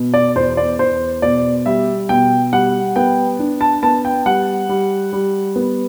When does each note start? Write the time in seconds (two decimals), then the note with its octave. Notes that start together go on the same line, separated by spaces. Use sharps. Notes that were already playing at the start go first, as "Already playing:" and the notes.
Already playing: B2
0.14 D5
0.36 E2 C5
0.57 D5
0.79 E2 C5
1.22 B2 D5
1.66 G3 E5
2.09 B2 G5
2.53 G3 F#5
2.96 B3 G5
3.39 D4
3.61 A5
3.83 B3 A5
4.05 G5
4.26 G3 F#5
4.69 G3
5.13 G3
5.56 B3